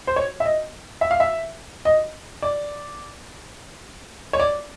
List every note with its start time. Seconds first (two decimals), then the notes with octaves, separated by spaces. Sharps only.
0.07 C5
0.16 C#5
0.40 E5
0.45 D#5
1.01 E5
1.11 F5
1.20 E5
1.85 D#5
2.42 D5
4.33 C#5
4.40 D5